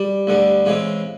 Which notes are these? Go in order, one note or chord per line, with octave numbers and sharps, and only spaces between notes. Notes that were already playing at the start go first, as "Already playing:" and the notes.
Already playing: G3
D2 D3 G3
C#3 E3 G#3 C4